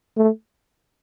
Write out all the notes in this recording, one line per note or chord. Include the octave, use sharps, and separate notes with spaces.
A3